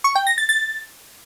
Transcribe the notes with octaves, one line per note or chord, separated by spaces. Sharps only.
C#6
G5
A#6
A6
A6